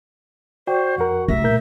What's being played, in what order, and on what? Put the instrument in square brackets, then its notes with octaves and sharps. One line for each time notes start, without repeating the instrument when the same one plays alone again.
[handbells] F#4 [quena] C5 [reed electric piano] D5 G5
[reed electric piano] F2 A#4 [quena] F#5
[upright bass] C2 [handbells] A3 A#6 [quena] E5
[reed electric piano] A#2 A#4 G6